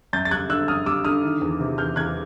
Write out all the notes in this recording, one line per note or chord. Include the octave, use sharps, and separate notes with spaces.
F#2 G6 A6
A6
G3 F#6 G#6
D3 E6 F#6
F#2 D#6 F6
G3 D6 E6
D3 D#6 F6
D#3
E2
C3
E2 F6 G6
E2 F#6 G#6